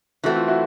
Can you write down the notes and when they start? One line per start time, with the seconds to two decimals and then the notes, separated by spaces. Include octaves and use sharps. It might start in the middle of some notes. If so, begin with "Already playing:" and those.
0.24 E3 A3 C4 F#4
0.36 F4
0.48 E4 F#4